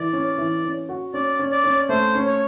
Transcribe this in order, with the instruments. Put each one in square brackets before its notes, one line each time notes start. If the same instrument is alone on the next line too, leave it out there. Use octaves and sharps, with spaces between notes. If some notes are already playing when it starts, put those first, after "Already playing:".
Already playing: [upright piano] E3 [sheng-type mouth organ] D5
[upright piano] C#4
E3
C#4
F#4
[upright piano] C#4 [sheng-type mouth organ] D5
[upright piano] C#4
[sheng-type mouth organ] D5
[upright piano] C#4
[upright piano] A3 [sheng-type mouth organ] C5
[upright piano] C#4
[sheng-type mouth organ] C#5